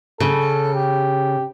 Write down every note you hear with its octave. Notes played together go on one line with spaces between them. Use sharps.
C#3 A4
G4